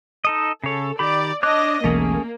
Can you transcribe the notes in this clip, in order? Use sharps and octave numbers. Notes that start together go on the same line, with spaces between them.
D#4 A4 D#5
C#3 A4 C#5
D#3 G4 D5 B5
D4 C#5 D#5 D6 F#6
E1 B1 E2 A3 A#3 C#4 G#4